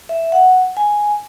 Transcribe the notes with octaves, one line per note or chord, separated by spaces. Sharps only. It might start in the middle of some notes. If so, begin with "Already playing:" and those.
E5
F#5
G#5